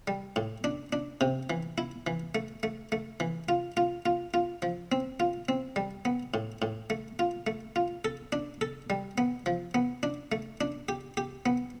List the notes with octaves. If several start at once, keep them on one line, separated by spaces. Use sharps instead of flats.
G3
A2
D4
D4
C3
E3
E4
E3
A3
A3
A3
E3
F4
F4
F4
F4
F3
C4
F4
C4
G3
B3
A2
A2
A3
F4
A3
F4
A4
D4
A4
G3
B3
F3
B3
D4
A3
D4
G4
G4
B3